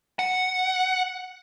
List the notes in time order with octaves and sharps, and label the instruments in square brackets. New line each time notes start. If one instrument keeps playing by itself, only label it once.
[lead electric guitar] F#5